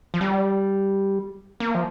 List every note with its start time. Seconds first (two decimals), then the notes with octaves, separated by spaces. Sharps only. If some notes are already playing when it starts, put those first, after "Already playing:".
0.14 F3
0.21 G3
1.60 A#3
1.75 F3